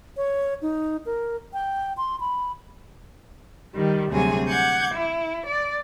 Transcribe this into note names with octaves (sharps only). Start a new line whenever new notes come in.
C#5
D#4
A#4
G5
C6
B5
D#3 G3
D2 C3 F#3 G3 G#4 G#5
F#5 D6 G6 G#6
E4
D5